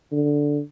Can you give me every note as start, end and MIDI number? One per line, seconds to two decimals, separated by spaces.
0.12 0.61 50